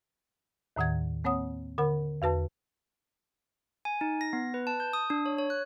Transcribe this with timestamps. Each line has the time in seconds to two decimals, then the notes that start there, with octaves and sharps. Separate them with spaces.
0.76 D#2 A2 D#3 F#5 G#6
1.24 A#3 C4 C#5 F#5 D#6
1.78 D3 A#4 F#5 B5
2.22 E2 F#4 B4 A5
3.85 G#5
4.01 D#4
4.21 A#6
4.33 B3
4.54 B4
4.67 A5
4.80 G6
4.93 D#6
5.10 D4
5.26 C#5
5.38 C#5
5.50 F#6